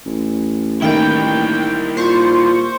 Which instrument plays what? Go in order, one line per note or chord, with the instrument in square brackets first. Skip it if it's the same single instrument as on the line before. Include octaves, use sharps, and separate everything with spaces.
[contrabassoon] A1
[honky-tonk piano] D#3 A#3 [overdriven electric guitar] G3 E4 [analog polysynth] G5
[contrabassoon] A#2 [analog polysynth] C5 C#6